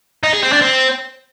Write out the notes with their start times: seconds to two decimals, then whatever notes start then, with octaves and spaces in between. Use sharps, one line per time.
0.24 D#4
0.33 G#4
0.43 C4
0.52 D4
0.62 C4